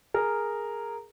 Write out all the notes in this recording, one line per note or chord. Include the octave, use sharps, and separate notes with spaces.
G#4 A#4